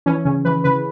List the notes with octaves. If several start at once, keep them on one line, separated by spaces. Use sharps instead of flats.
E3 C#4
C#3 C#4
E3 B4
C#3 B4